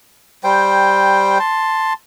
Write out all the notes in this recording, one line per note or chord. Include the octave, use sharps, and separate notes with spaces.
G3 C5 G5
A5 C6